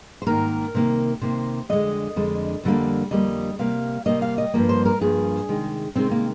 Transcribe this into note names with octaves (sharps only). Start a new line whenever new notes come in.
C5
G#2 D#3 A#3 A#4
C3 D#3 A#3
C3 D#3 A#3 C5
F2 D3 G#3 D#5
F2 D3 G#3
F2 D3 G3 A#3
F2 D3 G3 A#3 D#5
C3 G3 A#3 F5
C3 G3 A#3 D#5
F5
D#5
G2 F3 A#3
C5
A#4
G2 F3 A#3 G#4
C3 D#3 G#3
C3 D#3 G#3 C4
A#3